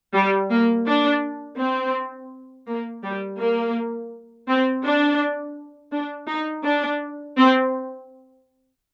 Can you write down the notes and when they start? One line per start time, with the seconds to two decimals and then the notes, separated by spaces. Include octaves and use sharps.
0.15 G3
0.51 A#3
0.86 D4
1.59 C4
2.67 A#3
3.04 G3
3.39 A#3
4.48 C4
4.83 D4
5.92 D4
6.28 D#4
6.65 D4
7.37 C4